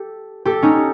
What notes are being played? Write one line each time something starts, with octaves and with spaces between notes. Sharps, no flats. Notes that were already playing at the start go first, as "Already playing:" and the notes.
Already playing: G4 A4
G4 A4
C#4 D#4